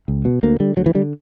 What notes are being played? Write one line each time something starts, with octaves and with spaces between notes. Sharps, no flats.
C#2
B2
D2 A#3
D3 G3
D2 F#3
E3
D3 G3